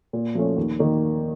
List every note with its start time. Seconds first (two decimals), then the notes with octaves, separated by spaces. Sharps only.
0.13 A#2
0.35 F3 A3 C#4
0.57 D#2
0.79 D#3 A#3